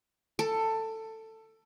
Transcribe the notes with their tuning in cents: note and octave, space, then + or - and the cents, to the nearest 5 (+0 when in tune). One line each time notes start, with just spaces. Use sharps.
A4 +15